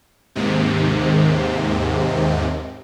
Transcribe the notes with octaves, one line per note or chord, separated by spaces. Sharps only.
D#2 G#2 C3